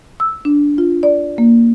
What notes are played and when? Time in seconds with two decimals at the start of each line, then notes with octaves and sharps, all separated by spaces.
0.20 E6
0.45 D4
0.78 F4
1.03 D5
1.38 A#3